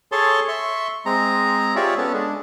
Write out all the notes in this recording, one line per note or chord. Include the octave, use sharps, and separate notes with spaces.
G#4 A4 C#5 A5 C6
E5 C6 C#6
G#3 C4 A#5
F4 G4 G#4 C#5 D5 E5
B3 C#4 A4
G#3 D4